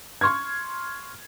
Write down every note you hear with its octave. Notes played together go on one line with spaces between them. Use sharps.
C6 C#6 F6 G#6